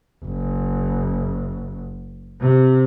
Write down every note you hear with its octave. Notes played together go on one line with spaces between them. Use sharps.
F#1
C3